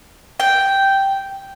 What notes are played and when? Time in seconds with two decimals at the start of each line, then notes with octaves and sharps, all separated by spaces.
0.40 G5